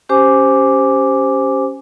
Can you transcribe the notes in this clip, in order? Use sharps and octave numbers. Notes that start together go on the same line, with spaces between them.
C#4 G4 C5 G#5 D6